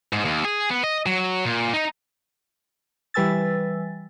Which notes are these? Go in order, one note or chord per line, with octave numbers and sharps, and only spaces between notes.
G#2
D#2
G#4
B3
D#5
F#3
A#2
D#4
E3 G3 B4 G#5 E6 A6